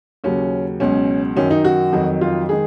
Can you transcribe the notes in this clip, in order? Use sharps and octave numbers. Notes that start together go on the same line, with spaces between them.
D#2 C#3 F#3 C#4
C#2 B2 F#3 C#4
F#2 D#3 F#3 C#4
D#4
F#4
F2 D#3 F#3
F4
D#3 G#3 G#4